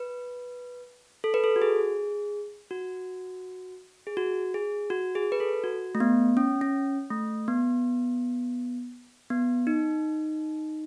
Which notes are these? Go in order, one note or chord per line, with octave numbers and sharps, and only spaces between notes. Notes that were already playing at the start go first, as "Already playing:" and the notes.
Already playing: B4
A4
B4
A4
F#4
G#4
F#4
G#4
F#4
G#4
F#4
G#4
B4
A4
F#4
A3
B3
C#4
C#4
A3
B3
B3
D#4